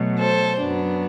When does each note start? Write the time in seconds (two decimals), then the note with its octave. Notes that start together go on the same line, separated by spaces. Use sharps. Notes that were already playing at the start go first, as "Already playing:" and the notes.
Already playing: B2 F#3 A3
0.20 A4 C5
0.59 F#2 F#3 B3 D4